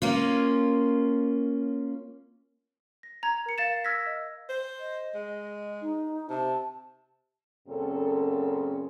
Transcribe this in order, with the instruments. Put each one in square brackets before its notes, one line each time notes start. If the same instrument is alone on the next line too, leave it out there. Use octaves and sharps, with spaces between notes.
[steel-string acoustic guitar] A#3 C#4 F4
[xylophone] A#6
A#5 G#6
A#4 C#7
F5 A6 E7
E6 F6 G6 G#6 A#6 B6
D#5
[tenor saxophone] C5
[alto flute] D#5
[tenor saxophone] G#3
[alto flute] D#4
[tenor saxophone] C3 [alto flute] A5
[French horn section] F#2 A#2 C#3 C4 A4